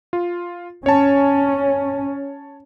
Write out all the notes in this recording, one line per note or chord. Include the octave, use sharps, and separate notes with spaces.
F4
C#4 C#5 A5